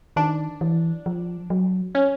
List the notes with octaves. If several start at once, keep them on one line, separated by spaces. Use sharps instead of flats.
D#3 D4
E3
F3
F#3
C#4